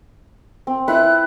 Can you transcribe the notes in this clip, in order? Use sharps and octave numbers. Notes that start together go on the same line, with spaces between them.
C4
E4 B4 B5 F#6